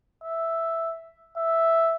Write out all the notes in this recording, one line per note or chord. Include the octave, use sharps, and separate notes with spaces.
E5
E5